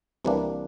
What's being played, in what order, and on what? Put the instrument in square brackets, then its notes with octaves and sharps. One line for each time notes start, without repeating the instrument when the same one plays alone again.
[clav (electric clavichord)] C2 C3 E3 A#3 D4